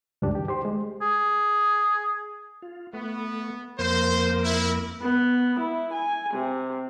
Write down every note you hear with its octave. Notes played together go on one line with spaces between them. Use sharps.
C#2 G2 D4 G4
D#3 G4
G4 C5 C6
G#3
G#4
F4
A3 B3
F2 A#3 A#4 C5
E4
B3
E4
G#5
C3